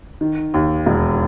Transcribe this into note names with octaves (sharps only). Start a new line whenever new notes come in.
D#3
D#2
E1